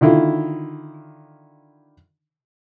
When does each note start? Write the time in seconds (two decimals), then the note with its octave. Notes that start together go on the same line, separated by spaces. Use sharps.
0.01 D3 D#3 E4 F4